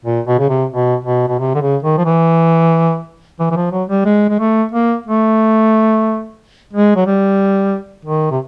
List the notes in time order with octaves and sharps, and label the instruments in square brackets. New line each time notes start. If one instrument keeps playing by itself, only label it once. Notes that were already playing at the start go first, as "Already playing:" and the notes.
[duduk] A#2
B2
C#3
C3
B2
B2
B2
C3
D3
C#3
D#3
F3
E3
E3
E3
F3
F#3
G3
G#3
G#3
A3
A#3
A3
G#3
F#3
G3
D#3
C3